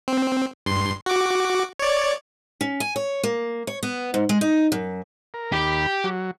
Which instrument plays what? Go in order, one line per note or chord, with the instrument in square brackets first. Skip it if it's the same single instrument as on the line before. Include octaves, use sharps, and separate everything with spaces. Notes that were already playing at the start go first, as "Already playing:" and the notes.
[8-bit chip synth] C4
G2 C6
F#4 D6
C#5 D5
[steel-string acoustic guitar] C#4
G#5
C#5
A#3
C#5
B3
G#2
G#3
D#4
F#2
[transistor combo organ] A#4
[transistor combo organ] D#2 B5 [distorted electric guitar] G4
[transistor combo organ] F#3